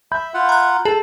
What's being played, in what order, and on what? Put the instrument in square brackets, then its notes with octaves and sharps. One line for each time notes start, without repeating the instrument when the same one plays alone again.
[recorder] E5 [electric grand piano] B5 G6
[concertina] F4 F#5
[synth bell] A#5 F#6
[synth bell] G#4 [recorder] A4 [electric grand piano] A5